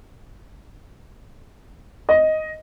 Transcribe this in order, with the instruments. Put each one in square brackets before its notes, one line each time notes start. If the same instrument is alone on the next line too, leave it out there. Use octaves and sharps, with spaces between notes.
[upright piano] D#5